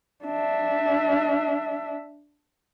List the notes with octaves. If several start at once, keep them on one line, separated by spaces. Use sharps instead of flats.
D4 E5